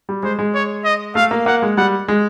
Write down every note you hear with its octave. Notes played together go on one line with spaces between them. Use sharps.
G3
G#3 C5
G#3
C#5
D#5
A3 F5
A#3
A#3 F#5
G#3
G3 F#5
G#3